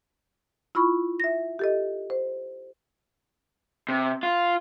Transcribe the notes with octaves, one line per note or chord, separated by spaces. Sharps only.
E4 F4 B5 C#6
E5 A#6
G4 A4 D#5
C5
C3
F4